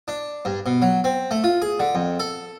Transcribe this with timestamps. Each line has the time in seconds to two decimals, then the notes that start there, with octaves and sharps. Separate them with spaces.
0.08 D4
0.45 G2
0.66 B2
0.82 F#3
1.04 C4
1.31 A3
1.44 F4
1.62 G#4
1.80 D3
1.95 F2
2.19 A4